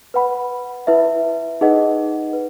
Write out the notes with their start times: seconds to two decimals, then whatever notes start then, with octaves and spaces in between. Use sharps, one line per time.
0.14 B4 F#5 B5
0.87 E4 B4 E5
1.61 D#4 G#4 B4 D#5 F#5
2.33 B4